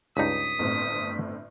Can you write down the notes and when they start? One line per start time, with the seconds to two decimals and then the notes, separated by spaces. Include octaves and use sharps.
0.17 C#2 G2 D#4 D#6 B6
0.59 G1 A2 C4